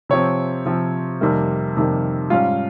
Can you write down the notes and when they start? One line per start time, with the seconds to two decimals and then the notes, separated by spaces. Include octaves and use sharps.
0.09 C3 F3 C4 C#5
0.65 C3 F3 C4
1.21 F2 C3 D#3 G3 A#3
1.76 F2 C3 D#3 G3 A#3
2.30 G#2 G3 C#4 F4 F5